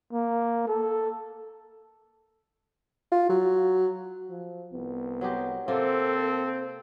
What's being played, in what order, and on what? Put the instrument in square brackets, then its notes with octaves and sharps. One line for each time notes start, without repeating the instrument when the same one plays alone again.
[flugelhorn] A#3
A4
[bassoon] F4
F#3
[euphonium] F3
[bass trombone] C2 [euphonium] B3
[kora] F#3 G#3 G4
[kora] C3 A#3 F4 [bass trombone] C4 [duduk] A4 [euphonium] A#4